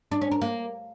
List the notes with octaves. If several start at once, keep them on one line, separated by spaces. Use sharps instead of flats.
D4
C#4
A#4
A#3